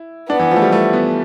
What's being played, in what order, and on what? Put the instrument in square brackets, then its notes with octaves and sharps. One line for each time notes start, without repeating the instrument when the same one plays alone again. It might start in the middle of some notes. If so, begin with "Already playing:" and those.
Already playing: [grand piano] E4
[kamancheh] B3 [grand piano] D4
[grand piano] E3
F3
A3
G3
A3
B3